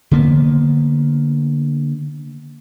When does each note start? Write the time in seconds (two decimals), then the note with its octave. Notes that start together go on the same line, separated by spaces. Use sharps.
0.11 D3 A#3 B3